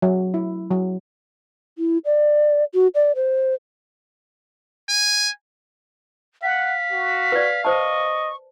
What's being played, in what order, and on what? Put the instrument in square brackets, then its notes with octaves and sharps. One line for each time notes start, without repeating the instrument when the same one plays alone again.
[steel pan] F#3
E4
F#3
[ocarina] E4
D5
F#4
D5
C5
[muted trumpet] G#5
[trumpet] F5 [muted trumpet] F#5 [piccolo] B6
[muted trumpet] F#4
[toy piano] B4 D5
[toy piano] C5 A5 [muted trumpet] D#5 [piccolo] C#6